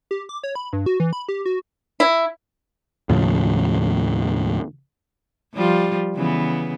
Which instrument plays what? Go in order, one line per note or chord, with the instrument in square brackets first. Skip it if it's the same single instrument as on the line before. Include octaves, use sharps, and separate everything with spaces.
[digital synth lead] G4
D6
C#5
B5
G2
F#4
E3
B5
G4
F#4
[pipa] E4
[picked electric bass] D#2 A2 C#3 F3
[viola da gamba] F3 G3 F4
C#3 E3 B3